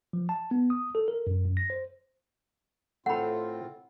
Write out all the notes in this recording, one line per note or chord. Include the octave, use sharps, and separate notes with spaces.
F3
A5
B3
D#6
A4
A#4
F#2
F#2
A#6
C5
A2 A3 C4 F4 A4 F#5 B5